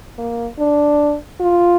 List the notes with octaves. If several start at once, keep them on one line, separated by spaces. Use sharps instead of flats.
A#3
D4
F4